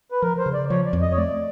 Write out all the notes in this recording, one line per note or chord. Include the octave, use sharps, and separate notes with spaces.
B4
F3 A#4
C5
C#3
D5
F3 C#5
D5
F2
D#5
C#5
A3 D5